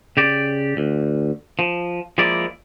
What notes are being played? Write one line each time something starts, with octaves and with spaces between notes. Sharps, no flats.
C#3 G4 D5
D2
F3
F3 G#3 A#3 E4 D5